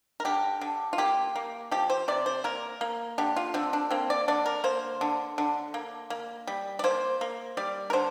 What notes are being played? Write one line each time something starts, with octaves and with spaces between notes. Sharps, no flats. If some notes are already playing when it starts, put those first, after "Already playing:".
A#4
D3 G4
D3
F4
A#3 G4
A#3
F3 G4
C5
C3 D5
C5
A#3 A#4
A#3
D3 G4
F4
D3 C4
D4
A#3 C4
D5
D3 D5
A#4
A#3 C5
D3
D3
A#3
A#3
G3
D5
A#3 C5
A#3
G3 D5
A#4
D3 C5